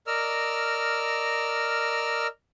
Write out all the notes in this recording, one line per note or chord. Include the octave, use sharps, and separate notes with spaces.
A#4 D5 D#5 E6 F6